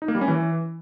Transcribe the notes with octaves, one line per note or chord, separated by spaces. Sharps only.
D#4
A#3
G3
C#4
E3